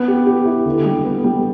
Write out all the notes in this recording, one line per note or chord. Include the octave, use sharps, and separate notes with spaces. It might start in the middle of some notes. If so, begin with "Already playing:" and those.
Already playing: B3
G4
G4
E4
D3
G3
B3
G3